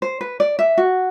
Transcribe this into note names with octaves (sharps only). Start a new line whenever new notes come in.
C5
B4
D5
E5
F#4